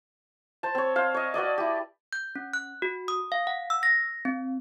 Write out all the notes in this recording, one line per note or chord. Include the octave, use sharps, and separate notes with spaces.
C5 A5
C4 C#5
C5 F5
C#5 D#5
F#4 B4 D5 D#5
E4 G4
G6
C#4
F#6
F#4
D#6
F5
F#5
E6
A#6
C4